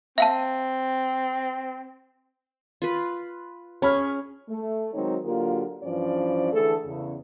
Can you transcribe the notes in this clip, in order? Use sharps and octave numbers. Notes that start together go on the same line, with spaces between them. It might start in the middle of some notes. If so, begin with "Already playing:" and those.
C4 E5 F5 A5
F4 B4
C#4 G#4 C#5 B5 F6
A3
D#3 F#3 G#3 C4 D#4 C#5
D3 F#3 A#3 F4 G4 A#4
G2 E3 F3 C#4 C5 D5
D3 E3 A3 G#4 A4
E2 C#3